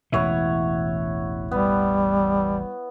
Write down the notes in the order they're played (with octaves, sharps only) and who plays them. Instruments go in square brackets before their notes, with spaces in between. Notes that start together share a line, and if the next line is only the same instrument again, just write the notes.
[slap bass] E1 A1 E3 [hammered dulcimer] E4 C#5 F#5
[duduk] G3 [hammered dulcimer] B3